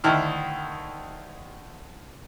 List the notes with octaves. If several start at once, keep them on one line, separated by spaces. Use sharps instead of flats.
D2 D#3 D#4 E4 F6